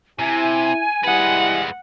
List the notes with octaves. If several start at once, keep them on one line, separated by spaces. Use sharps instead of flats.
C3 E4 G#5
G3 G#3 E4 B4 F#5